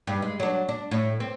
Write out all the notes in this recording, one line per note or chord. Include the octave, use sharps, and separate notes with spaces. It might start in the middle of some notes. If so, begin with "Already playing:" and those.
G2
G#3
F#3 D4
D4
A2
C4